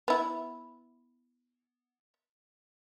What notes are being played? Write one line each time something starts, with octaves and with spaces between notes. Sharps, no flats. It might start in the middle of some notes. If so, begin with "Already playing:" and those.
B3 E4